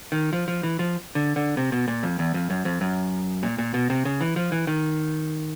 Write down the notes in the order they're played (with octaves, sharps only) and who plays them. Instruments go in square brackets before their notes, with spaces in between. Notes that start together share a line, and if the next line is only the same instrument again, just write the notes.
[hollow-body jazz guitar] D#3
F3
F3
E3
F3
D3
D3
C3
B2
A#2
F2
E2
F2
F#2
F2
F#2
A#2
A#2
B2
C3
C#3
E3
F3
E3
D#3